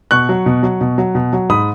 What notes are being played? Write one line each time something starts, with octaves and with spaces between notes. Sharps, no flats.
B2 C#6 F#6
F#3
B2
F#3
B2
F#3
B2
F#3
G#2 B5 D#6